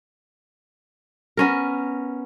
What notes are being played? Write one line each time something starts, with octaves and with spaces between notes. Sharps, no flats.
B3 C#4 A#4